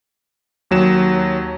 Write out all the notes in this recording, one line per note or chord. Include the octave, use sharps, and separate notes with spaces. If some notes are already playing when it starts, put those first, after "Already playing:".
D#2 F#3 E7